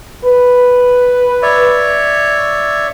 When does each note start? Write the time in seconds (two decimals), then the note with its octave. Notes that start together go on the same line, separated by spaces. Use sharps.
0.24 B4
1.42 C#5 D5 E5